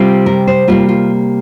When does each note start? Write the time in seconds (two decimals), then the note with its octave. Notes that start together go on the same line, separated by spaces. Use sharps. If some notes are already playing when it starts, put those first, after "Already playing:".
Already playing: C3 G3 C4 F4
0.26 A#4
0.47 C5
0.68 C3 G3 A#3 F4
0.89 F4